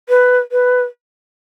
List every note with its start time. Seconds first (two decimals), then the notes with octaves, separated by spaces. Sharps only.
0.09 B4
0.52 B4